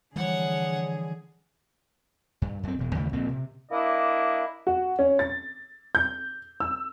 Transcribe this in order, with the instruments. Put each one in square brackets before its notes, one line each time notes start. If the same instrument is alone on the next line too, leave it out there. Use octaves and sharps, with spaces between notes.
[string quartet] D3 G#4 [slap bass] E3 F3 G3 [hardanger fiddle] C#5 F#5
[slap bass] G2
F#2 C4
E1 B2
D#2 C#3 E3 A3
A#1 A#2 A#3 C4
C3
[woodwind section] A#3 D4 E4 D#5 D6
[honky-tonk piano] F#4
C#4
A6
G6
E6